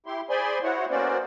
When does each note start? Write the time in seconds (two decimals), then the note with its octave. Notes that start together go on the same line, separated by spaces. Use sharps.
0.06 E4 G4 C6
0.30 G#4 C5 D5 G#5 B5 C6
0.63 E4 F#4 C5 C#5 F#5
0.90 A#3 B3 C#4 F#4 C5 D5